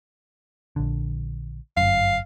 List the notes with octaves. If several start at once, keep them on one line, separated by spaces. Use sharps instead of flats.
A#1 D3
G1 F#2 F5